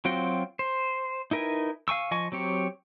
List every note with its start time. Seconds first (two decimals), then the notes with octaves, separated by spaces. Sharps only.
0.05 F#3 C4 F4 F#4 G5
0.59 C5
1.31 D#4 E4 A#4 B4 G#5
1.88 F5 G#5 C#6 E6
2.11 F3 D#5 G#5 C#6
2.32 F#3 C4 G4 C#5